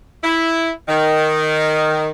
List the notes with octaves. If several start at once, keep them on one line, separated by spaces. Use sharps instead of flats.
E4
D#3